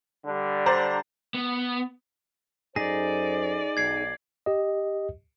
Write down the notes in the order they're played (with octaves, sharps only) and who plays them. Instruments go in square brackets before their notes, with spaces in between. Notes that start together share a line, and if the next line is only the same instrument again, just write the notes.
[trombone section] D3 G3 D4
[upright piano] C5 D5 A#5
[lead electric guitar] B3
[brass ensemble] F#2 A4 C5 [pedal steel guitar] D#4 G#4 [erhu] D5 [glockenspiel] A#6
[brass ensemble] B1 [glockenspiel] G#6 C7
[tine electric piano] G4 D#5